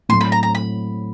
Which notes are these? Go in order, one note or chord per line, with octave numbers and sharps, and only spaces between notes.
A2 F#3 A3 C4 C6
B5
A#5
A#5
B5